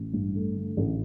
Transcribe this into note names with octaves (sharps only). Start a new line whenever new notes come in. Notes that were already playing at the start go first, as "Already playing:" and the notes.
Already playing: A1
G2
A3
D3
A1